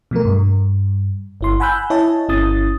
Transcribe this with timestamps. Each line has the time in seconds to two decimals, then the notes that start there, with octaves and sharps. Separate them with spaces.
0.11 B2 F3 A3 A#4
0.25 G2
1.41 G1 E4 C6
1.60 F#5 G#5 B5 E6 F#6 G6
1.90 E4 C#5 D#5 E5 G#5 A5
2.29 G1 C#4 E4 D#6 A6